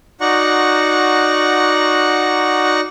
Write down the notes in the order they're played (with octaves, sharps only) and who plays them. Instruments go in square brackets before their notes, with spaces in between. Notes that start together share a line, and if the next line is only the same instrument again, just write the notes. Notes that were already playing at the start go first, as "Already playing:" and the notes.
[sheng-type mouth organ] D#4 F#4 D5 F#5 A#5 C#6